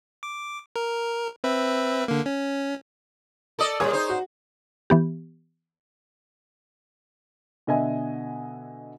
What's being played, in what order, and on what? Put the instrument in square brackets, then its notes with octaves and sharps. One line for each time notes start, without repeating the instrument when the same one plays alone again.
[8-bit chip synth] D6
A#4
C4 B4 E5
D3 A#3
C#4
[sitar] A4 D5 D#5
[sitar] A#2 G3 A#3 [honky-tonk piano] G#4 C#5 D#6
[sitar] D#4 C5
[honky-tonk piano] F#4
[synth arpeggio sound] E3 B3 G4
[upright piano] B2 D3 D#5 E5 G#5